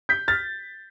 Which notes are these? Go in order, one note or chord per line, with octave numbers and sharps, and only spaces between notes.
G6 B6
F6 A6